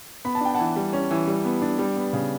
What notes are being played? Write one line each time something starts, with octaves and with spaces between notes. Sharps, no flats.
B3 B5
A5
D4 G5
E3 F#5 A5
G3
C#4
E3
G3
B3
D4
G3
B3
C#3